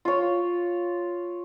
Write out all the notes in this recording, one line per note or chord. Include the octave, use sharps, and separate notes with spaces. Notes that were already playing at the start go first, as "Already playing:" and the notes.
F4 C#5